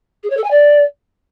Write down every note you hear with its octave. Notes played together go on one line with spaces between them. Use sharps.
G#4
C#5
A4
G#5
D5